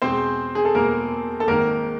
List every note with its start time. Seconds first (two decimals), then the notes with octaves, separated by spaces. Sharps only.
0.02 E2 B2 G#3 C4 C5
0.55 G#4
0.65 A4
0.74 E2 B2 G#3 A#3 A#4
1.40 A4
1.47 G#1 G#2 D#3 A#3 A#4